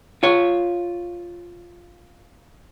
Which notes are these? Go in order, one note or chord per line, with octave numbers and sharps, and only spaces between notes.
F4 C#5